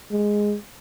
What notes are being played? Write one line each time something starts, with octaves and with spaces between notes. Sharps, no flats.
G#3